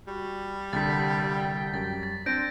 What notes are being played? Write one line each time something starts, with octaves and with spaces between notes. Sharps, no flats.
G3 F#4
C2 D3 G5 A6 B6
F#2 G3 A6
A6
C4 D4 C5 G6 A#6 D7